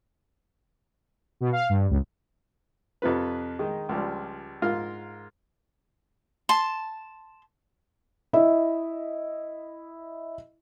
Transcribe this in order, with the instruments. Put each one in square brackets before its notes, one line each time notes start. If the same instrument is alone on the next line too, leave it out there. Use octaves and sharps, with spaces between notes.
[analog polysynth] B2
F5
G2
C#2
[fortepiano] F2 C3 F4 B4
D#3 G#3 D#4
C#2 F3 G3
G#2 F4 A#4 F5 F6
[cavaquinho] A5 C6
[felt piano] E4 D#5 E5